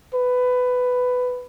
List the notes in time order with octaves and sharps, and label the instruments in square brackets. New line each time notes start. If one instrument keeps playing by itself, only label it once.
[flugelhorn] B4